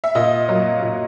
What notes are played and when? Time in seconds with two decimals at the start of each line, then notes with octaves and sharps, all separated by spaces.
0.04 E5
0.15 A#2 D#5
0.48 F#3 A#3 D#5
0.82 A#2